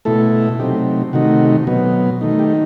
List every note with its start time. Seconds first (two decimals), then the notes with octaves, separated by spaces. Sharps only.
0.05 B2 A3 E4 A4
0.59 C3 F#3 A3 C4 D#4 G4
1.13 C3 D#3 A3 D#4 F#4
1.67 B2 F#3 B3
2.21 D#3 A3 D#4
2.39 G4